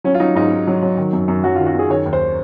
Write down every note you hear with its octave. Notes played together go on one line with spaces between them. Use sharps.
F#3 C#4
F4
F#3 D#4
G#2 D#4
G#2
F#3
F#3
D#3
F#2
F#2
F#3 F#4
F4
D#3
F#4
F#2 G#4
D#3 C#5
D#2
C5